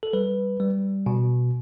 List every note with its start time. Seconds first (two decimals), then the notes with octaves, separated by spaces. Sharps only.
0.03 A4
0.13 G3 B4
0.60 G3
1.06 B2